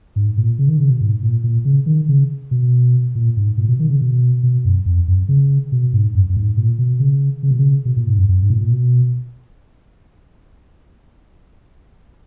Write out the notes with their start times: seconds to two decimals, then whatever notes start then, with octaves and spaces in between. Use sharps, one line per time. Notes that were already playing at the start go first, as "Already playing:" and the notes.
0.16 G#2
0.37 A#2
0.59 C#3
0.69 D#3
0.80 C#3
0.90 B2
1.01 G#2
1.22 A#2
1.44 A#2
1.65 C#3
1.86 D#3
2.09 C#3
2.51 B2
3.15 A#2
3.37 G#2
3.58 A#2
3.68 B2
3.80 D#3
3.90 C#3
4.01 B2
4.43 B2
4.65 F#2
4.86 F2
5.08 F#2
5.28 C#3
5.72 B2
5.93 G#2
6.14 F#2
6.29 F#2
6.37 G#2
6.57 A#2
6.79 B2
7.00 C#3
7.43 C#3
7.51 B2
7.59 C#3
7.85 B2
7.97 A#2
8.07 G#2
8.17 F#2
8.29 F#2
8.43 G#2
8.50 A#2
8.61 A#2
8.71 B2